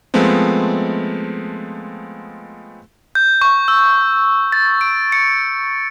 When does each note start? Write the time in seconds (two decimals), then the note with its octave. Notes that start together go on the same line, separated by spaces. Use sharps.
0.14 F3 G#3 A3 B3 C4
3.15 G6
3.41 C#6
3.68 E6
4.52 A6
4.81 D7
5.12 C#7